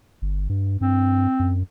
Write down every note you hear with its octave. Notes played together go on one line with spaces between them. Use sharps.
G1
G2
G2 C4
F#2